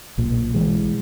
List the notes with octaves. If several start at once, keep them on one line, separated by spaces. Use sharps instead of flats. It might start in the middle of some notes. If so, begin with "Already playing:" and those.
B1 A#2
E3 G#3